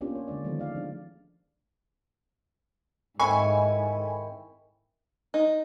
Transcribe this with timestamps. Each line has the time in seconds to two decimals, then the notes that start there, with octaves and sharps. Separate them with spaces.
0.01 A#3 B3 C#4 D4 F4 G4
0.15 C#5
0.28 D3 G#3 D4 D5
0.44 D#3 F3 G#3 A3 B3
0.59 D5 F5
0.75 F3 D4
3.20 G#2 D#3 C4 E4 A4 G#5 B5 C#6
5.34 D#4